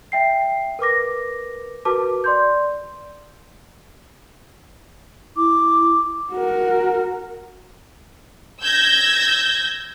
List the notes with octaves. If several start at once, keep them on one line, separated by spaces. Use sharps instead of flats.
E5 G5 C7
A#4 B4 D6 A#6
F#4 A#4 B4 A5 D6
D5 C6 G6
E4 D6
F#4 A#4
E6 G6 G#6 A#6